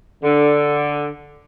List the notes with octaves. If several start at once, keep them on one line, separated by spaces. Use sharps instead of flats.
D3